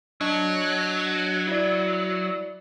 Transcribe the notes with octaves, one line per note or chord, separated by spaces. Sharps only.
F#3 D4 D#5
E4 D5